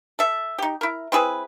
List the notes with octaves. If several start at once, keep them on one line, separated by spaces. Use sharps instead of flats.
A4 E5
D#4 G4
E4 A#4
C4 E4 G#4 B4